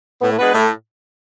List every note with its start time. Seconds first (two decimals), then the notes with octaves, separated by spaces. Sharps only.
0.21 A2 B3
0.32 A3
0.38 G#3 B3 D4 F#4 B4
0.54 A2 A3